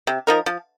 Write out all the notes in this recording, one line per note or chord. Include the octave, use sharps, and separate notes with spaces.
C3
F3 D#4 A#4
F3